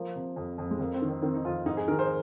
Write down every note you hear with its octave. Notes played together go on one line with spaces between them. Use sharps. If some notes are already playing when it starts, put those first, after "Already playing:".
Already playing: F3 A#3
C3
F2
F2
G#3
F2 A#3
C4
D#3
C4
D#3 C4
D#4
F2 F4
G#2 D#4
G#4
D#3 A#4
C5